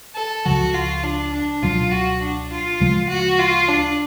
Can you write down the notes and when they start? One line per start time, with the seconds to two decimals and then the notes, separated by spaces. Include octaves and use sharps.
0.16 A4
0.45 C#2 C#3 F3 F#4
0.74 F4
1.04 D4
1.33 D4
1.62 C#2 B2 F#3 F4
1.92 F#4
2.22 D4
2.51 F4
2.80 D2 C#3 F3 G#3
3.09 F#4
3.39 F4
3.68 D4